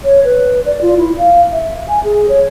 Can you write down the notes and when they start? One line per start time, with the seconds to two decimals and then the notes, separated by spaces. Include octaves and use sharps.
0.05 C#5
0.24 B4
0.66 D5
0.81 F4
0.97 E4
1.18 F5
1.53 E5
1.89 G#5
2.04 G#4
2.29 C#5